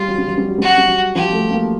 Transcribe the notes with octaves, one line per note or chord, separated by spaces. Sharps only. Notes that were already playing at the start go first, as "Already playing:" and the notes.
Already playing: G3 F4
F#3
G3
F#3
G3
F#3
G3 F#4
F#3
G3
F#3
F3 G4
A3
A#3